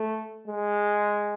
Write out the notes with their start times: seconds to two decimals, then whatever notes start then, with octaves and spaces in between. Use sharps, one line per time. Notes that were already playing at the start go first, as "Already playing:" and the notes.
Already playing: A3
0.47 G#3